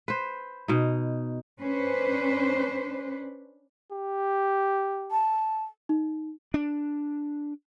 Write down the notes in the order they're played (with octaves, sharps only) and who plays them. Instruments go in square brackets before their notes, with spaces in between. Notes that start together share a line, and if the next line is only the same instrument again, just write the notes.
[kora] B4 C5
B2 D#4
[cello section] C#4 D4 B4 C5
[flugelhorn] G4
[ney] A5
[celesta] D#4
[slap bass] D4